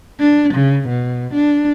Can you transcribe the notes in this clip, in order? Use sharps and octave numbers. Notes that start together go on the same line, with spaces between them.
D4
C#3
B2
D4